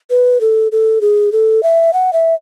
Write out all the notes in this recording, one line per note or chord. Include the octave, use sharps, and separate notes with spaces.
B4
A4
A4
G#4
A4
E5
F#5
E5